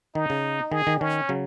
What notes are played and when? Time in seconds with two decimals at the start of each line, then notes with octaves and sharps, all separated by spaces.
0.15 D#3 D#4
0.30 C#3
0.72 D#3 G#4
0.87 D#3
1.01 D#3 C#4
1.29 C#3 F#3